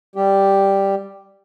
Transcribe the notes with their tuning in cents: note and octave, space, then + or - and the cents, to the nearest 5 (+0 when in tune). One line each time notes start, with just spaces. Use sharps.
G3 +0 G4 +0